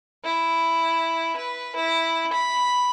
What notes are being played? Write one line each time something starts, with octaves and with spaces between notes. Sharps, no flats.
E4
B4
E4
B5